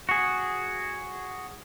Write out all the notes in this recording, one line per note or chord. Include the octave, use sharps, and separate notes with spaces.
F#4 G#4